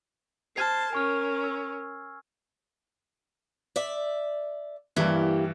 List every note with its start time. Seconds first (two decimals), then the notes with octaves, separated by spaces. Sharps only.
0.56 C5 A5 F6 G#6 C7
0.93 C#4 A#4 G#5 C#6 F6
1.44 E6
3.76 D5 E5
4.96 G2 E3 A#3 E4 G4